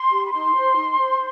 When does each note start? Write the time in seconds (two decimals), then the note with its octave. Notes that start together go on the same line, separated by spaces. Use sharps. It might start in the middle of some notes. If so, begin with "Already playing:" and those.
Already playing: C6
0.10 G4
0.25 B5
0.32 D#4 C6
0.55 C5
0.76 D#4
0.98 C5